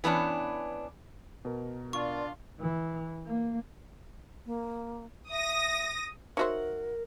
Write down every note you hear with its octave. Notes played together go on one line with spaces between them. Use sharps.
E3 B3 C#4 D4
B2 A#4
D4 F4 D5 C#6
E3
A#3
A#3
E5 D#6 A#6
D#4 F#4 A#4 C5 C#5 E5 F#5